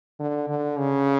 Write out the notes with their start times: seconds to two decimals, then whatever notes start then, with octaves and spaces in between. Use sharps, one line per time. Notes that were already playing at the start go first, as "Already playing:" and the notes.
0.19 D3
0.49 D3
0.78 C#3